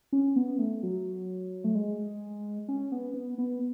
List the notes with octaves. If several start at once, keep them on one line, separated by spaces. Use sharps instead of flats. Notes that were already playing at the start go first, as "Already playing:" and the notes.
C#4
B3
A3
F#3
A3
G#3
C#4
B3
B3
B3